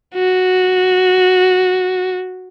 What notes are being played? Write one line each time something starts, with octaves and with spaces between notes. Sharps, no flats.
F#4